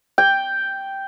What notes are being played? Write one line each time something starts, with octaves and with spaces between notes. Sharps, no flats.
G5